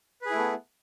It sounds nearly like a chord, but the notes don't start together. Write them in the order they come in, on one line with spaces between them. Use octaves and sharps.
B4 G#4 E4 A3 B3